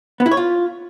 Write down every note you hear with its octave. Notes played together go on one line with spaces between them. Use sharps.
B3
E4
C#5
F4